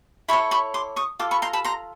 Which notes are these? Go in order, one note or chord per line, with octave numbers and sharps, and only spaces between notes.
E4 A4 C#5 B5 C#6
B5 C#6
C6 D6
C#6 D#6
F4 A4 D6
B5 C#6
A#5 C6
A5 B5
A#5 C6